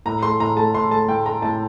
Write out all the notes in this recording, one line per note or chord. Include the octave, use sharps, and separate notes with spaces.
A2 A#5
A3 C6
A2 A#5
A3 A5
A2 C6
A3 A5
A2 G5
A3 A#5
A2 A5